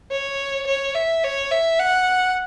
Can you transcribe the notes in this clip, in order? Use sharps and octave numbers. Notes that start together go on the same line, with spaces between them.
C#5
C#5
E5
C#5
E5
F#5